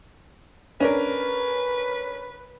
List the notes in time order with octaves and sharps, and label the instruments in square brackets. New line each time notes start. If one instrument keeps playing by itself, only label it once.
[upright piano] C#4 D4 A#4 [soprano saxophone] B4